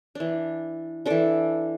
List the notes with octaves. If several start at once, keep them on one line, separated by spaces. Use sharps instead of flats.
E3 D4
E3 D4 A4 D5